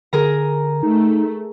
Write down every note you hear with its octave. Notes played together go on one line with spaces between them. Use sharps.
D3 G#4 A#4 A#5
A3 D#4